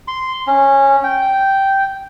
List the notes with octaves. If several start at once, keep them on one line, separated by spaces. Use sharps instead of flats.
C6
C#4
G5